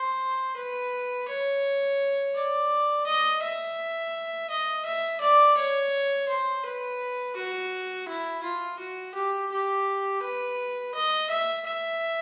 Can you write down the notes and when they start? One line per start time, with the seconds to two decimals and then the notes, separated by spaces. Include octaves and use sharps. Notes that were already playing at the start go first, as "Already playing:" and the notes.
Already playing: C5
0.57 B4
1.28 C#5
2.35 D5
3.07 D#5
3.42 E5
4.50 D#5
4.86 E5
5.21 D5
5.57 C#5
6.29 C5
6.65 B4
7.36 F#4
8.08 E4
8.44 F4
8.79 F#4
9.15 G4
9.52 G4
10.22 B4
10.95 D#5
11.30 E5
11.66 E5